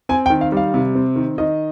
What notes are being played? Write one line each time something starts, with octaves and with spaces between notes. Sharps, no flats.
C4 G#5
G5
D#3
F5
G3 F5
C3
C4
D#3
D#3 D#5